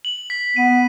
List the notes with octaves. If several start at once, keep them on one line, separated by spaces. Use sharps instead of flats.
F#7
B6
B3 D#7